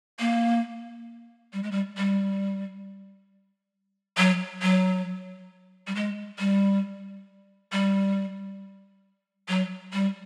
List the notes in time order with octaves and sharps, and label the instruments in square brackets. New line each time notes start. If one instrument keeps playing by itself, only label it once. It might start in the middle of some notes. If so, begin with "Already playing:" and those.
[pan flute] A#3
G3
G#3
G3
G3
F#3
F#3
G3
G#3
G3
G3
F#3
G3